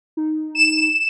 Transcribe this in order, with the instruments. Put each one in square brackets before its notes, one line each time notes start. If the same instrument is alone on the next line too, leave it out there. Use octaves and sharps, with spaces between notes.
[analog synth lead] D#4
[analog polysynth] E7